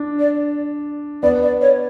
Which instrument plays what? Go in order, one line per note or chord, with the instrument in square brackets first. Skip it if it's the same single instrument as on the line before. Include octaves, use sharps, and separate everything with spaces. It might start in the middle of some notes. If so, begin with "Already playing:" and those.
Already playing: [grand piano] D4
[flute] D5
[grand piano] B3 [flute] D5
[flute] D5
C#5